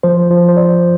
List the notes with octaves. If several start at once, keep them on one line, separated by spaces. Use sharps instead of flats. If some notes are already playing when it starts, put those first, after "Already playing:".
F3 C5
F3 C5
C5
F3 D5